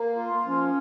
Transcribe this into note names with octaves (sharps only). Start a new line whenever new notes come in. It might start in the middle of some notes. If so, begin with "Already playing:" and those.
Already playing: A#3
F4
F3 C#4